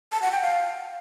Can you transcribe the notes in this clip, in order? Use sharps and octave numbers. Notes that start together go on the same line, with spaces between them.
A5
F#5
G5
F5